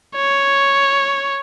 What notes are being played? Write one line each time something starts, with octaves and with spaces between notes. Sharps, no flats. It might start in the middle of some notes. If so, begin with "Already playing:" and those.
C#5